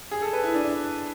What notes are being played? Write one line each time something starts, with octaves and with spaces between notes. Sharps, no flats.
G#4
A4
B4
E4
D4